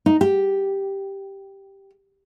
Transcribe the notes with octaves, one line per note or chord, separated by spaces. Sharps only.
D#4
G4